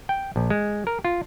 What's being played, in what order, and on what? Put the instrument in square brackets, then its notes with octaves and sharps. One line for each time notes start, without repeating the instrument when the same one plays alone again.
[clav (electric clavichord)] G5
A#1
G#3
A#4
F4